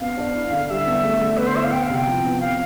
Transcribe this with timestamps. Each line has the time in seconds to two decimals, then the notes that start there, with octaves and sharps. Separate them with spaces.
0.01 B3 F5
0.17 D4
0.35 E4
0.52 D3
0.70 G3 E5
0.87 B3
1.04 A3
1.21 D3
1.38 B3 B4
1.47 C5
1.55 E4 E5
1.64 F5
1.72 B3 G5
1.83 F5
1.90 C3
1.96 G5
2.07 F3
2.24 B3
2.40 C4 F5